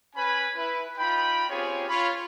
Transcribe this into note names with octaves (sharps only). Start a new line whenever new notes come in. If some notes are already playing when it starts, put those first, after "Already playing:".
C#4 B4 G#5 B5
E4 B4
D#4 F4 G5 B5
C4 C#4 F4 G4 G#4 C#5
F4 C#5 B5